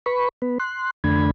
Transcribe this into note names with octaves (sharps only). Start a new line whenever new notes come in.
B4 B5 C#6
B3 B4
C6 F#6
F2 D3 A3 D4 B5 G#6